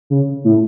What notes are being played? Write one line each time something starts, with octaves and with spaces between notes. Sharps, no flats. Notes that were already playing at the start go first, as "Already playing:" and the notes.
C#3
A2